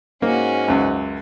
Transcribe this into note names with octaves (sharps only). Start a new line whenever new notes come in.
G#2 A#3 C#4 F#4
C#2 F#2